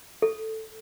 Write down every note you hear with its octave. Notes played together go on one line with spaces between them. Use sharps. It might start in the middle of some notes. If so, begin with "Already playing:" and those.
A4